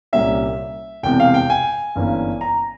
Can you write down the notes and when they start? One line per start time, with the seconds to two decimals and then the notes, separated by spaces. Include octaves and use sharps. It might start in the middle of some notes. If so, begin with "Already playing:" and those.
0.13 C2 A#2 G3 A#3 C#4 E5
1.03 E1 E2 C3 G5
1.20 F5
1.34 G5
1.50 G#5
1.96 G1 G2 E3 A#3 C#4
2.41 A#5